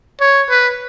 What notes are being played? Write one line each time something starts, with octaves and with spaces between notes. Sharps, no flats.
C#5
B4